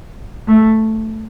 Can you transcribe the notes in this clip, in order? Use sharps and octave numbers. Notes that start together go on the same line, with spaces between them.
A3